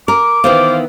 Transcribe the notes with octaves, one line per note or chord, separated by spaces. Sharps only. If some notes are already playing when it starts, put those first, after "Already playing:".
A#4 D6
D#3 E3 B3 C5 F5